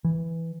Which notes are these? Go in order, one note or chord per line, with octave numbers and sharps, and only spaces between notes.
E3